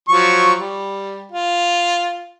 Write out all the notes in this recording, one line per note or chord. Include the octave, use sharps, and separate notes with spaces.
F3 F#3 C#6
G3
F4